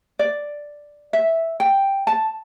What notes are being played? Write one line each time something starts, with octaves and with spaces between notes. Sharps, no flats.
D5
E5
G5
A5